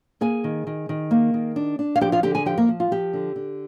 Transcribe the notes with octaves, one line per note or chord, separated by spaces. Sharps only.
A#3 G#4 G#5
D#3
D#3
D#3
A#3
D#3
D4
D4
F5
F3 G4 G5
F4 F5
D3 G4 G5
G#4 G#5
F3 G4 G5
A#3 A#4
F3
F4
F3 G4
D3
D3